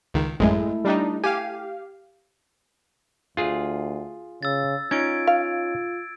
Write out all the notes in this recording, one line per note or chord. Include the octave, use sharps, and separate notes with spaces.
C#2 D#3
A1 F#2 G#3 A3 E4
G3 D4 D#4
G4 F5 G#5
D2 F4 G#4
C#3 E6 A6
C#4 D#4 F4 G#6 D7
F5